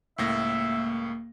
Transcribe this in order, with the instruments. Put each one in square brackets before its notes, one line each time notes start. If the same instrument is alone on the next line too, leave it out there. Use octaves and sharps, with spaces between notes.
[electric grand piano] C#2 A2 A#6 [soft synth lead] A#3 [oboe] E5